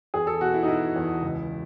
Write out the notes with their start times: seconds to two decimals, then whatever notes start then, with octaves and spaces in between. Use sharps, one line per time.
0.14 E2 G#4
0.27 A4
0.41 B2 F#4
0.54 E4
0.63 D#4
0.68 B2 E4
0.96 E2
1.23 C#2